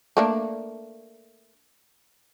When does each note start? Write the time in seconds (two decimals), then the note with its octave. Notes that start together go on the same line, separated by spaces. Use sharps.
0.17 A3 A#3 D4